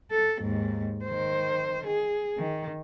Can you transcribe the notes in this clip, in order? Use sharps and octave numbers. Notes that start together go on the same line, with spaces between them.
A4
D#2 G#2
D#3 C5
G#4
D#3